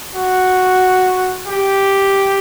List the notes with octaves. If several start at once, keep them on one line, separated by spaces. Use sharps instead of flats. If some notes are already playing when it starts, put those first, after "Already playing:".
F#4
G4